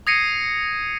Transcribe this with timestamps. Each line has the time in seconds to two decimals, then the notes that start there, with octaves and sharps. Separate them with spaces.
0.07 D#6 G#6 A#6 C7 C#7 D#7